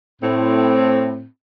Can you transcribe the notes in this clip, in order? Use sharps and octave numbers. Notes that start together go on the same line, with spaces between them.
A2 C4